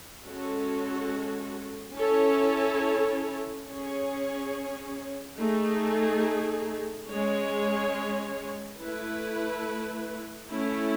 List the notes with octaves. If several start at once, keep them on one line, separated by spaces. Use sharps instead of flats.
G#3 C#4 F#4 A4
C#4 E4 A4 C#5
C#4 G#4 C#5
A3 D#4 G#4
G#3 C#4 G#4 C#5
A3 E4 B4
A3 C#4 E4